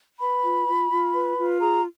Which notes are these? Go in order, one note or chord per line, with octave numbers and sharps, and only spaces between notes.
B4 B5
F4
F4
F4
B4
F4
G#4 A#5